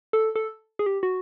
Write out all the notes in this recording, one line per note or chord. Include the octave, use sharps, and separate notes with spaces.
A4
A4
G#4
G4
F#4